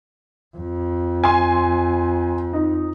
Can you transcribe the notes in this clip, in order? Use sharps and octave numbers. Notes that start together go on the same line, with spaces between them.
F2
G#5 C6
D#4